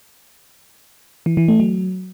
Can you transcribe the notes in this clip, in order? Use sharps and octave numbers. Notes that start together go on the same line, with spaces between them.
E3
E3
A3
F#3